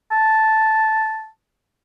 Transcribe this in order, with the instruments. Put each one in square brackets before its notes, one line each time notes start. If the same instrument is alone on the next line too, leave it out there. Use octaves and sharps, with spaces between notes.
[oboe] A5